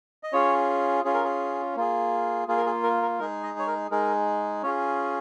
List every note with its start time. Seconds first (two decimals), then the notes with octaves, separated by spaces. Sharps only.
0.23 D#5
0.33 C#4 F4 G#4 C#5
1.04 C#4 F4 G#4
1.14 A#4
1.24 G#4
1.76 A#3 F4 G#4
2.47 A#3 F4 G#4
2.57 A#4
2.66 G#4
2.83 A#4
3.02 A#4
3.19 G#3 D#4 G#4 A#4
3.43 D#5
3.59 C#5
3.67 A#4
3.91 G#3 D#4 G#4 A#4
4.63 C#4 F4 G#4 C#5